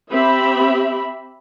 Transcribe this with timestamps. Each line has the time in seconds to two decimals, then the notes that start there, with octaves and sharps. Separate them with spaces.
0.11 C4 G4 E5 B5